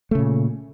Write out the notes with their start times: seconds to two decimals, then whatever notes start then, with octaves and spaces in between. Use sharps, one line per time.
0.11 A3
0.15 C#3
0.19 A#2